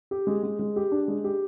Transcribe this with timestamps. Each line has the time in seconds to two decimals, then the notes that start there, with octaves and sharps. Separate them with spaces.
0.11 G4
0.27 G#3
0.43 G#3
0.59 G#3
0.76 G4
0.92 D4
1.08 G#3
1.24 G4